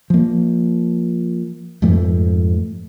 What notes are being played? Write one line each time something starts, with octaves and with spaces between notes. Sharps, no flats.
F3 A#3
F2 G#2 F3 A3